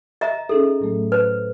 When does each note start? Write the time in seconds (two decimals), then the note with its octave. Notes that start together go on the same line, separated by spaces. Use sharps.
0.21 D#5 E5 A#5
0.49 C#4 D#4 G#4 A4
0.80 A2 F#3 A3
1.12 B4 C5